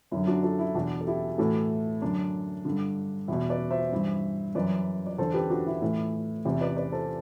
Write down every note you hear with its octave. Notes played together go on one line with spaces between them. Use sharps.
F#2 D3 E4
D4 F#4
F#4 A4
E4
E2 B2 D4 F#4
A4
E4 G4
A2 E3 F#4 A4
F#2 D3 D4
G2 D3
E2 B2 E4
B4 D5
C5 E5
G2 E3
F#2 E3 B4 D5
D5
E2 D3 A4 C5
G4 B4
D4 F#4
E4
A2 E3
E2 C3 E3 E4
B4 D5
B4 D5
A4 C5